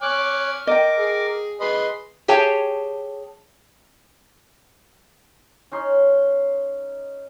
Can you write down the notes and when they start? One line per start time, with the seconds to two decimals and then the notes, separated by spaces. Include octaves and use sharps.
0.02 C#5 G#5 D6 F6 F#6
0.67 A#4 D#5 G5 D6
0.99 G#4
1.61 G#4 B4 D#5 C6
2.28 G4 G#4 C#5 G5 A5
5.72 C#4 D#4 C6